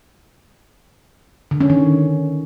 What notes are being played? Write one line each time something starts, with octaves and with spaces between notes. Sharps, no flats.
D3
C#4
D#3